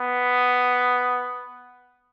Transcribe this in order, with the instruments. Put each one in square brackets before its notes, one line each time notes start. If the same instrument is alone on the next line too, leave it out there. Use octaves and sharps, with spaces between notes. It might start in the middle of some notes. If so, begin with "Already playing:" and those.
Already playing: [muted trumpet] B3